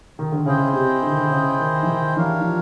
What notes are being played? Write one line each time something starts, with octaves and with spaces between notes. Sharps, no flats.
D#3
D3
C#3 E4 G#4 C5 D#5 G5
C3
D3
D#3
D3
C#3
D#3
E3
D#3
E3 D4 G4 A#4 C#5 F5
E3
F3